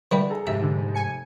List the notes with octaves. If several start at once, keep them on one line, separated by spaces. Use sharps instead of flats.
D3 E3 G3 B4
G#4 A4 A#5
F1 G#2 G4 E5
D3
G#5 C#7